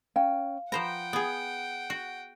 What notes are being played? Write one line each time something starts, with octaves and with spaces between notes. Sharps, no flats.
C#4 F5 G5
F3 B4 C5 F#5 G5 A#5
B3 G#4
F#4